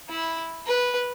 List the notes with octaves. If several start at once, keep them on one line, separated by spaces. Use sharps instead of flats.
E4
B4